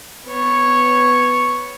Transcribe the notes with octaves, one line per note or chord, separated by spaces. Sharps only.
B3 C#5